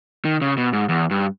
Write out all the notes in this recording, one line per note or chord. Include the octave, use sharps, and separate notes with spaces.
D#3
C#3
B2
G#2
E2
G2